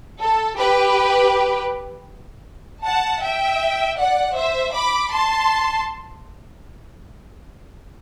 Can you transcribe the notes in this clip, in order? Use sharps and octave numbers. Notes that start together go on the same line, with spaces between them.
A4
G4 B4
F#5 A5
E5 G5
D5 F#5
C5 E5
B5 D6
A5 C6